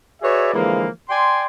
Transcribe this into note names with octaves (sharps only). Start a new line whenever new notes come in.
F#4 G#4 B4 C#5 D5 E5
D3 E3 F3 G#3 A#3
D5 G5 G#5 C6